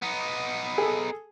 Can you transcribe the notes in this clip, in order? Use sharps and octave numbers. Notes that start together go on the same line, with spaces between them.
B3 D#4
G#4 A4